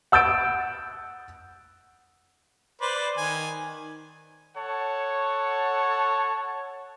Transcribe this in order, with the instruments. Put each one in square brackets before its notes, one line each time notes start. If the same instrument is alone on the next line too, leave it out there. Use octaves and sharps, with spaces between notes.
[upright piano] F#5 E6 G6 A6 D7
[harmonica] B4 C5 D5
D#3 G#5
[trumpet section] A4 C#5 F#5 A5